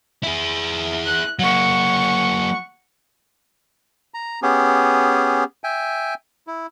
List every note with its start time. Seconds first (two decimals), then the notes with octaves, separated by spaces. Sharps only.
0.23 E4 G#4
1.06 F#6
1.39 F#3 A#3 F#5 C#6
4.14 A#5
4.42 B3 C#4 G4 G#4
5.64 E5 G5 G#5
6.47 E4